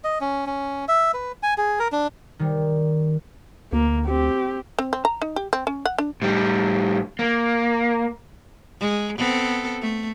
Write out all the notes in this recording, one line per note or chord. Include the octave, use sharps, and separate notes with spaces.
D#5
C#4
C#4
E5
B4
G#5
G#4
A#4
D4
D#3 G3
D2 A#3
C4 G4
C4
C4
A#5
D#4
G4
C4
C#4
F#5
D4
A2 G3
A#3
G#3
B3 C4 A4
A3